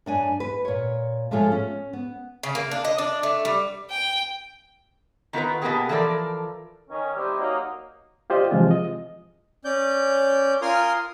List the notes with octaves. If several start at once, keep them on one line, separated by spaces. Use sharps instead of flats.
F#2 D4 G#5
B4
A#2 C#5
A2 F3 G#3 A3 F4 A4
C#4
B3
C#3
A#3
D4
D#5
D4
A3
G3
G5
D#3 B3 F4 G#4 A#4 B4
B2 A#3 B3 E4 G4 G#4
E3 F3 A4 A#4 D5
D#3 C#4
G3 C4 D#4 E4 G4 C5
F#3 A#3 D#4
F4 G4 C5 D5 D#5
C3 E3 F3 G#3 C4 F4
D#5
C#4 D5 G6
F4 A#4 G#5 C6 D#6 F6